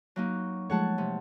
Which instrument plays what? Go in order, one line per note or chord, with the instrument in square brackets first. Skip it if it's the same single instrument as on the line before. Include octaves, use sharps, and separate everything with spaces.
[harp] F#3 A#3 D#4
[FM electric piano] F3 G#3 A3 [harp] C#5 F#5 A5
[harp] C3